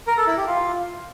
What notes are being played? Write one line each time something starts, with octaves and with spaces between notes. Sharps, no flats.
A#4
A4
E4
G4
F4